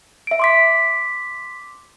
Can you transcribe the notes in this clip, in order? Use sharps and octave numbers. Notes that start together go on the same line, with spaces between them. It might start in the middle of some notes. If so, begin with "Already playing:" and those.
E5 D7
C6 D6 B6